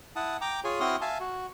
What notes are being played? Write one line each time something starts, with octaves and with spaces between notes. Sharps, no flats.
E4 F#5 A5 D#6
G5 A#5 D6
F4 G#4 C#5 G#5
C4 E4 F#4 C6 D#6 F6
E5 F5 G#5 A5
F#4